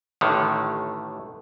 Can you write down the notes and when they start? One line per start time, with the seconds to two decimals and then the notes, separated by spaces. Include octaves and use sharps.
0.21 A1 A2 D3 D#3